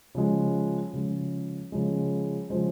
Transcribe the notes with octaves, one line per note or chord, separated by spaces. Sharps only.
C#3 F3 G#3
C#3 F3 G#3
C#3 F3 G#3
C#3 F3 G#3 C5